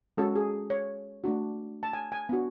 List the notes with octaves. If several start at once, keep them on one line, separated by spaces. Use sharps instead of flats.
G#3 C#4 F#4 A4
G#4
C#5
A3 D4 F#4
A5
G#5
G#5
B3 D4 F#4